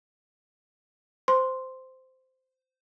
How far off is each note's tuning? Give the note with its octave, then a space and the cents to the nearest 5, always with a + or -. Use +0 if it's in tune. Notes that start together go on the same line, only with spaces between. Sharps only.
C5 -10 C6 +0